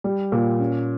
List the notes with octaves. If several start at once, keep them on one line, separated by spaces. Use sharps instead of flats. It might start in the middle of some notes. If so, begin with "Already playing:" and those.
G3
A#2
C#4